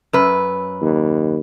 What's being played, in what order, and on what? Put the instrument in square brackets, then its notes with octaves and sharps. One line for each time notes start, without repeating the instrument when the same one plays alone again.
[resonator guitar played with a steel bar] F#2 B4
[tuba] D#2